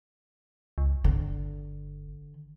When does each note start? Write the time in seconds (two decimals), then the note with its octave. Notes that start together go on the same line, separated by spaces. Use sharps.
0.78 C#2
1.04 G1 D3